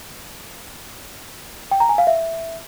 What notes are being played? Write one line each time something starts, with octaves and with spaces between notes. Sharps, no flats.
G5
A#5
G#5
F5
E5